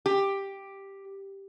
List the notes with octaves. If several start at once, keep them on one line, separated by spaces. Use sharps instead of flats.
G4